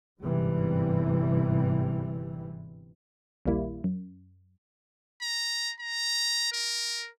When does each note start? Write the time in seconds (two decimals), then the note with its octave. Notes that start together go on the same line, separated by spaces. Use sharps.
0.21 G1 G#2 C3 E3 G3
3.46 A#1 D#2 G3 A#3 E4
3.84 F#2
5.22 A#5
5.80 A#5
6.52 A#4